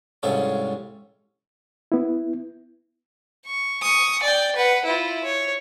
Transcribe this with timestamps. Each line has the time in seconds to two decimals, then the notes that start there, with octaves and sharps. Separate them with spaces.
0.23 C2 G#2 C#3 F4 A4 C#6
1.92 B3 E4
3.45 C#6
3.82 C#6 D#6
4.23 D5 G5
4.56 B4 F#5
4.85 E4 F4
5.24 C#5